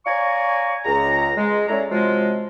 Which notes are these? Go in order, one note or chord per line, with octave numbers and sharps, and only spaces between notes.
C#5 D5 F5 G#5 A#5 C#6
C#2 A#5
G#3
C#4 E4 A4 C#5 D5 A#5
C3 F3 F#3 G#3